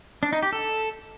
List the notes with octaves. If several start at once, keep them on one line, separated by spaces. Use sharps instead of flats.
D4
D#4
G4
A4